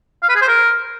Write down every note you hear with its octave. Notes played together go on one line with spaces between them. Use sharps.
F5
B4
G#4
C5
A#4